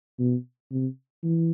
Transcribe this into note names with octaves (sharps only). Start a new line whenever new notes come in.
B2
C3
E3